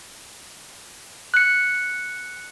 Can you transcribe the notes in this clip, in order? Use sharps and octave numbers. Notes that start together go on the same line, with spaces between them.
F#6 C#7